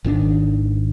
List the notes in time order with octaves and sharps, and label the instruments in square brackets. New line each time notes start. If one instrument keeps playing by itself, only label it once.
[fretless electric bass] G#1 D#3 C4 D4